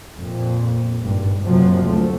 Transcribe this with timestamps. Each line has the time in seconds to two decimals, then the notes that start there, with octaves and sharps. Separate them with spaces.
0.18 F2 A#2
0.98 G#1 G2
1.42 F#1 F#2 C3 F3 F#3
1.86 D2 A3